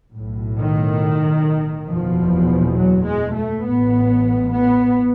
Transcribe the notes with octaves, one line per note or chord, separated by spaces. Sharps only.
B1 A2
D#3
F#1 E2 B2 F3
F#3
G#3
A3
A1 A2 B3
B3